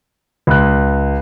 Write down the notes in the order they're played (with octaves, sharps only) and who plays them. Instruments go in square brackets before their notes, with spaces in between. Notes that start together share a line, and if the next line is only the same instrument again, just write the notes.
[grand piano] C#2 F#6